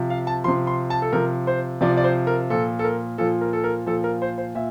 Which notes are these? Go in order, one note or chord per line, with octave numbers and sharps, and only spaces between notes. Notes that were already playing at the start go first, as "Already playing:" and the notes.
Already playing: C3 F3
F5
A5
C3 F3 C6
C6
A5
A4
C3 F3 A#4
C5
C3 F3 D5
D5
C5
A#4
A#2 F3 A4
A4
A#4
A#2 F3 A4
A#4
A4
A#4
A#2 F3 A4
A#4
C5
C5
A#2 E5